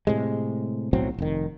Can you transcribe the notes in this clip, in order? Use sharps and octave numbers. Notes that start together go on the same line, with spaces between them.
A2 C3 G#3
B1 A2 F#3 C4
F1 D#3